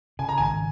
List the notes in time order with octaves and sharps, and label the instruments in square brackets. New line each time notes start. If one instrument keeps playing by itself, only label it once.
[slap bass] C#3 [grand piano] G#5
[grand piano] A#5
[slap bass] G#1 [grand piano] G#5